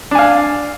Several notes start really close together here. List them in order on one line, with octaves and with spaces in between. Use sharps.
D4 G#5 F5